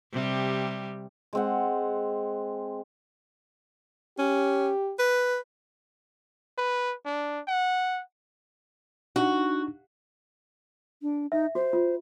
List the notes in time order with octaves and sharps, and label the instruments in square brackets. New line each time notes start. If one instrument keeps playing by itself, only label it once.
[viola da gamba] C3 G3
[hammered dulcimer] G#3 C4 F#5
[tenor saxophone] C#4 [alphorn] G4
[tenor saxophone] B4
[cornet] B4
D4
F#5
[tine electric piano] D4 D#4 [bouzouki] F#4
[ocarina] D4
[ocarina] D#4 [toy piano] E5
[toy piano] F#4 [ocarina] C5
[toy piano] F4